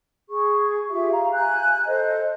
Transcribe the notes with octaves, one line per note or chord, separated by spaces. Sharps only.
G#4 C#6
F4 G4 G#4 E5
F5 A#5
G#5 F#6 G6
A4 C5 D#5